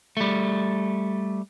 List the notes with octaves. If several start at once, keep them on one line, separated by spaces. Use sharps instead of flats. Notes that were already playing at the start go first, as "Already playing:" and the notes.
G3 A3